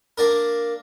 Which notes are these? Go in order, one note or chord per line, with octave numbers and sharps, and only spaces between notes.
A#3 D4 A#4